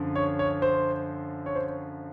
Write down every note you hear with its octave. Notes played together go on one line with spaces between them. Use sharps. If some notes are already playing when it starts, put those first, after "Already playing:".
Already playing: F#2 D3 F3
C#5
C#5
C5
C#5
C5